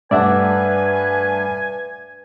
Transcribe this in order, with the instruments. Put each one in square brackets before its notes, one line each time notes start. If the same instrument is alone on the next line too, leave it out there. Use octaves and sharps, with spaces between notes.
[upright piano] G2 A3 D4 [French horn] B4 [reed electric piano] D5 E5 F#5 [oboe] G#5